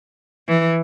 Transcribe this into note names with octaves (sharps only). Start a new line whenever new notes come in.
E3